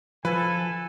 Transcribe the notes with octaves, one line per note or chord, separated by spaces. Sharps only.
F3 A4 B4 G#5